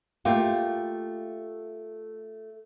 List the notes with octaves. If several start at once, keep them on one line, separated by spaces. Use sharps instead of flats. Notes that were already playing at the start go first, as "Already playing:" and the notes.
A3 A#3 F4 G4